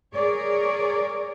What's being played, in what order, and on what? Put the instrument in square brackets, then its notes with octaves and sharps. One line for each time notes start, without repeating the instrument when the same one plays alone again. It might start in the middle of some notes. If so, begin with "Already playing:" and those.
[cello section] G#4 A#4 C#5 D5